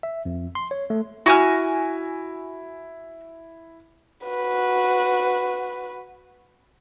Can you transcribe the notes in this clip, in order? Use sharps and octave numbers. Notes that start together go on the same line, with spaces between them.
E5
F2
C6
C#5
A3
E4 F#4 G#5 F6
F#4 B4